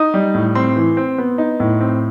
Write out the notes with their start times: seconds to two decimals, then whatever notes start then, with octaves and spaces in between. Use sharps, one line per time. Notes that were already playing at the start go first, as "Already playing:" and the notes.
Already playing: D#4 D#6
0.14 G3
0.35 A2
0.55 C4 C6
0.76 E3
0.97 C4
1.18 B3
1.38 D#4
1.60 A2
1.81 C4